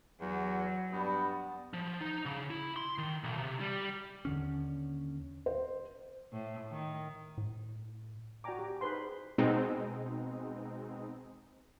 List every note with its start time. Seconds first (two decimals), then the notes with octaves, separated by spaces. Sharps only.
0.21 E2 F#3
0.92 G2 G3 B3
1.74 F3
2.01 D#4
2.25 C#3
2.50 E4
2.76 C6
2.98 D#3
3.24 B1
3.38 C3
3.60 G3
4.25 D#2 D3 C#4
5.46 C5
6.33 A2
6.71 D#3
7.37 A2
8.44 F#4 D5 G5 G#5 A#5 D6
8.59 G4
8.81 D#4 G#4 B4 C5 C6
9.38 B2 G#3 C4 D#4